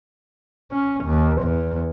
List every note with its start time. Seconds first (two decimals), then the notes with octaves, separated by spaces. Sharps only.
0.72 C#4
1.05 D#2
1.42 E2